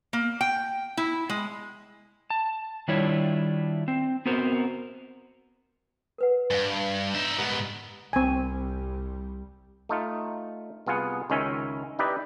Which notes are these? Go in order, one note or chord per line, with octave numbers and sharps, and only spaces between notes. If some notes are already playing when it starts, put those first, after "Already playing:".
A#3
G5
E4
G#3
A5
D#3 G3 D4 E4 F4 C#5
C4
B3 C4 F#4 A#4 C5
A#4 B4 F#5
G2 F5 G#5
D#4 E5
G#2 B3 G4 A#4 A#5
C2 G3 C4 G#5
A3 D#4 F4
C2 B3 F4 G#4 F#5
C#2 D#3 C#4 E5 G#5
D#4 E4 G4 B4 D5 D#5